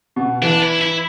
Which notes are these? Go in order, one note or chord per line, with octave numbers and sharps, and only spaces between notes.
B2
E3 D4
E4
E4